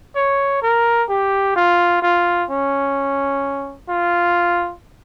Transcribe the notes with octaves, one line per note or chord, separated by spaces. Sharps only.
C#5
A#4
G4
F4
F4
C#4
F4